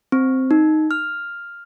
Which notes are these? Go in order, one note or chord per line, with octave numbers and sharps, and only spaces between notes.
C4
D#4
F6